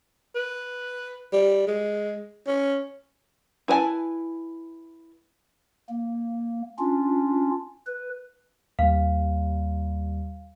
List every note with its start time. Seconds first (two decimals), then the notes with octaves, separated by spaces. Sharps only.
0.35 B4
1.33 G3
1.67 G#3
2.47 C#4
3.68 E4 B4 C#5 G#5 A5
5.89 A#3
6.79 C#4 D4 F4
7.87 B4
8.79 D#2 G3 F5